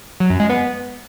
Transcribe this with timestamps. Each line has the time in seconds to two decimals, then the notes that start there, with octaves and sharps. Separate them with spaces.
0.20 F#3
0.30 F#2
0.40 G#3
0.50 B3